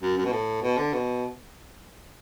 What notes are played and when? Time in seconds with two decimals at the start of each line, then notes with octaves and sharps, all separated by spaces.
0.02 F#2
0.17 F#2
0.25 B2
0.32 A2
0.62 B2
0.78 D3
0.93 B2